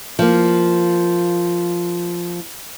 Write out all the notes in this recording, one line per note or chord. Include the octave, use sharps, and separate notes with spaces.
F3 A#3